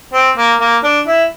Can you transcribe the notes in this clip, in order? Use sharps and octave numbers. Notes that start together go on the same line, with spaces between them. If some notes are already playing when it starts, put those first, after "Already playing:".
C4
A#3
A#3
D4
E4